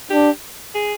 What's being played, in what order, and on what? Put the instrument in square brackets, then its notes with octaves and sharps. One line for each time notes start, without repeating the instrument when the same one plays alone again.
[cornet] D4 [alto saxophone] G4
[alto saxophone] G#4